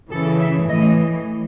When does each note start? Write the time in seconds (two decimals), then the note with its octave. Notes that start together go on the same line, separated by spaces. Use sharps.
0.11 C#3 E3 A4
0.41 E5
0.68 A2 E3 D#5